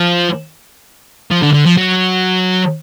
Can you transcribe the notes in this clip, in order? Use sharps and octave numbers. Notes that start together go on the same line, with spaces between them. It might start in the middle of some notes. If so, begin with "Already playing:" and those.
Already playing: F3
F3
D3
D3
F3
F#3